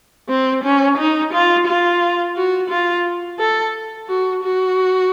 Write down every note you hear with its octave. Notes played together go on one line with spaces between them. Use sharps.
C4
C#4
D#4
F4
F4
F#4
F4
A4
F#4
F#4